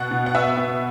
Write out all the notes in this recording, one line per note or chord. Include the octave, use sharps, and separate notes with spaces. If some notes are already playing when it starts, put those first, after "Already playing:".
Already playing: B2 F#5
B2
F#5
B3 E5
B3